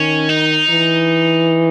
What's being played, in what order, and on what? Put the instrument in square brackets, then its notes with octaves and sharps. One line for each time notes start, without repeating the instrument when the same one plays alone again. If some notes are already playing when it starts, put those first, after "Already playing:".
Already playing: [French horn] D#3 [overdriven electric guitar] C#4
[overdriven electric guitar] D#4
[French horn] E3